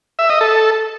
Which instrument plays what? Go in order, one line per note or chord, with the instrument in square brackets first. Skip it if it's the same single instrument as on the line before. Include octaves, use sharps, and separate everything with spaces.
[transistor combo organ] E5
D#5
A4